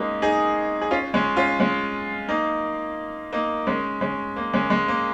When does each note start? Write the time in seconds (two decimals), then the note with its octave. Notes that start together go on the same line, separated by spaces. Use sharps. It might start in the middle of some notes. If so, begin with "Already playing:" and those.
Already playing: G#3 A#3 C#4 D#4
0.22 D#4 G#4
0.81 G#4
0.91 C#4 F4
1.14 G#3 C#4
1.37 C#4 F4
1.59 G#3 C#4
2.29 A#3 D#4
3.33 A#3 D#4
3.67 G#3 C#4
4.01 G#3 C#4
4.36 A#3
4.53 G#3 C#4
4.70 G#3
4.88 A#3